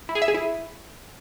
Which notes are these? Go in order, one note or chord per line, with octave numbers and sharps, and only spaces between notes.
E4
G#4
E5
G#4
E4